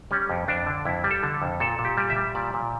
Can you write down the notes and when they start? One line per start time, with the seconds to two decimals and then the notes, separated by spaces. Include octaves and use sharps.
0.11 G3 C#4
0.30 F2
0.48 F2 D4
0.66 D3
0.85 F2 E4
1.04 G3
1.11 A4
1.23 D3
1.42 F2
1.60 A#2 A4
1.79 A#2
1.85 G4
1.97 G3
2.10 E5
2.16 G3
2.35 A#2 D5
2.54 A#2